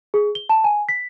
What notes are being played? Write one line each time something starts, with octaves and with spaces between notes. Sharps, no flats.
G#4
G7
A5
G#5
B6